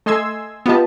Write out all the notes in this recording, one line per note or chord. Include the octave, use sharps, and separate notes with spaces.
A3 D#5 G#5 C6 E6 G#6
B3 F4 G4 D#5 A5